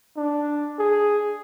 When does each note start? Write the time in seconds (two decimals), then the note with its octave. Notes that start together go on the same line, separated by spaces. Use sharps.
0.17 D4
0.79 G#4